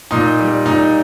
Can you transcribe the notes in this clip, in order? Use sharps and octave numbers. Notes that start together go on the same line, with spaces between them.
A#2 D#4
G3
A#2 D#4